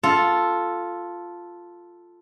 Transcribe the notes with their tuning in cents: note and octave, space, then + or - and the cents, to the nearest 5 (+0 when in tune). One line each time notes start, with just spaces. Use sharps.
F4 +0 A4 +0